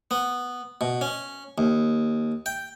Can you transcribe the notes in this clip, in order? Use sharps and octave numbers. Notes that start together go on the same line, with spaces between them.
B3
B2
C#4
D#2
G5